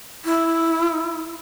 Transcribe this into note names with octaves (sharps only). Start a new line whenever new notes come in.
E4